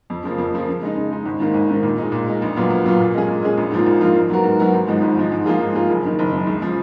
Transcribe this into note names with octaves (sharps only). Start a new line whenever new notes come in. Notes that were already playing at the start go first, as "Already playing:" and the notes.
F2
C#3 F3 A#3
F2
C#3 F3 A#3
C#3
G#3 D#4
C#3
G#3 D#4
G#1
G#2 D#3 A#3
G#1
G#2 D#3 A#3
A#2
G#3 D#4
A#2
G#3 D#4
A#1
A#2 F#3 B3 F4
A#1
A#2 F#3 B3 F4
A#2
G#3 C#4 G#4
A#2
G#3 C#4 G#4
A#1
G#2 F3 A#3 F4
A#1
G#2 F3 A#3 F4
G#2
F#3 B3 F#4 A#4
G#2
F#3 B3 F#4 A#4
G#1
G#2 F3 G#3 D#4
G#1
G#2 F3 G#3 D#4
G#2
F3 A#3 F4 G#4
G#2
F3 A#3 F4 G#4
F#1
F#2 D#3
F#1
F#2 D#3
C#2
C#3 F3